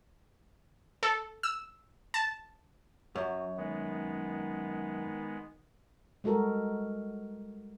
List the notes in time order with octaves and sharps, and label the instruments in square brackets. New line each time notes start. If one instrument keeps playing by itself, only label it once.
[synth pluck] A4
E6
A5
[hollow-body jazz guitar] F#2 [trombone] F#3
[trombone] D#3 [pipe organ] G#3 B3
[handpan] G3 G#3 F#4 A4 A#4